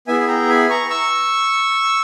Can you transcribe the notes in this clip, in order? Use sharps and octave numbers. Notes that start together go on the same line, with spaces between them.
B3 E4 G#4 E5 G#5
G#5
G5 A#5
G#5 B5
A#5 C#6
C#6 E6